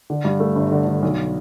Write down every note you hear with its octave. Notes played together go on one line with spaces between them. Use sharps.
D3
G2
A3
G1
D3
D3
B1